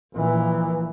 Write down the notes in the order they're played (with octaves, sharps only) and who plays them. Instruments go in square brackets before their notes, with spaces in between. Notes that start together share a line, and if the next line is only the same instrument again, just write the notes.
[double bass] A#1 E3